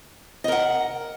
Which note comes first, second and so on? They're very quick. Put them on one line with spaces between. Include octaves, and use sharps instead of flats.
D#5 A#4 F#5